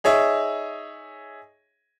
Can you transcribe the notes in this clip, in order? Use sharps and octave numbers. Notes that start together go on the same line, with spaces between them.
D#4 G#4 C#5 E5